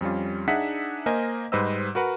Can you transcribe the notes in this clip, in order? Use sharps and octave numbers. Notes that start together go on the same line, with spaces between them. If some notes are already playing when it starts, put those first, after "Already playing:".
F2 G3 C#4 F4
D4 D#4 G#4 E5 F#5 B6
A#3 A#4 C5 D#5 G#5
G#2 G3 B4 C5 D#5 E6
F#4 A#4 B4 F#5